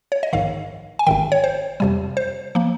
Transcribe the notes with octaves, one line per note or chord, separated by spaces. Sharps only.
C#5
D#5
A#1 G#2 D#3 F5
G#5
G#1 G#2 D#3 G5
C#5
C5
F2 C3 G3
C5
F3 A#3